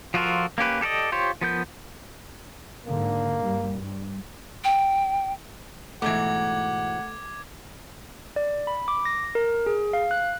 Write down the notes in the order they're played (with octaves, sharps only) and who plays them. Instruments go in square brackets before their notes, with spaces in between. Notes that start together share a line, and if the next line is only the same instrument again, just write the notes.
[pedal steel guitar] F3 F4 F#4 A4 A#4
A#3 C#4 G4 B4
G4 A4 A#4 D5 D#5
F4 G4 C5 C#5
F3 B3 A#4 G6
[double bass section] G#2 D3 [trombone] A#3
[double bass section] G2 G3
G2
[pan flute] G5
[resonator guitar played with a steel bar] G#2 B2 E3 [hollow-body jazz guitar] A3 [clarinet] F#5 [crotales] D6 G#6
[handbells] D5
B5
D6
A#6
A#4
G#4
F5
F#6